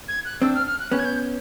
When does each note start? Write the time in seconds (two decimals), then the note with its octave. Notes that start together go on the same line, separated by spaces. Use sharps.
0.08 G#6
0.25 F#6
0.42 C4 D4 E6
0.55 F6
0.67 F6
0.79 F#6
0.91 B3 C#4 F#6
0.99 G#6
1.05 G6